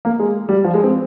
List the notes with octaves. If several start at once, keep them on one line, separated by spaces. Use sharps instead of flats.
A#3
G#3
G3
F3
G#3
C4